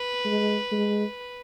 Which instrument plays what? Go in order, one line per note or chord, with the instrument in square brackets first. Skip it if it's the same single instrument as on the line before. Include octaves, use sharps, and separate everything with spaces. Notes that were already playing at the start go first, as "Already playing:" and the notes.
Already playing: [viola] B4
[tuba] G#3
G#3